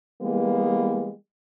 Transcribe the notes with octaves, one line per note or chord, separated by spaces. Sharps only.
E3 G3 G#3 A#3 B3